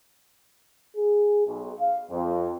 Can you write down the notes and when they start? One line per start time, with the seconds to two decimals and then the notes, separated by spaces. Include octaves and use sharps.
0.97 G#4
1.46 B1
1.79 F5
2.11 F2